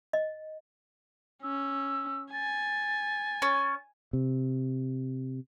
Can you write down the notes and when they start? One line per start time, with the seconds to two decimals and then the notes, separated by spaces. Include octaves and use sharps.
0.13 D#5
1.43 C#4 E6
2.33 G#5 A6
3.42 C#4
4.13 C3